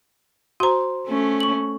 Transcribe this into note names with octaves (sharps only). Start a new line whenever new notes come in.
F#4 C5 A#5 C6
A3 C#4
C#6 F#7